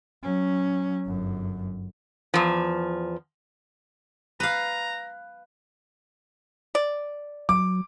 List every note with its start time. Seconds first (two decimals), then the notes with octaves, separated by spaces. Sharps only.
0.23 F#3 C#4
1.07 G1 F#2
2.34 E2 F3
4.40 B4 F5 A#5
6.75 D5
7.49 F#3 D6